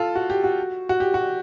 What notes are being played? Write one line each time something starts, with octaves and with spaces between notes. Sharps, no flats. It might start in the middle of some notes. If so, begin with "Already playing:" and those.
Already playing: F4 A4
F#4
G4
F#4
F#4
G4
F#4